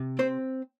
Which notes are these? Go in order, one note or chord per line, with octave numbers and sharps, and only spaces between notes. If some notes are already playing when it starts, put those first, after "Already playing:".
Already playing: C3
C4 C5